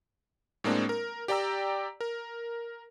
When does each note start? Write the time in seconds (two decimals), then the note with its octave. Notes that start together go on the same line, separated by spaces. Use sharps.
0.64 A2 G#3 A#3 C4 D4
0.89 A#4
1.28 G4 D5 G5 A#5 E6
2.01 A#4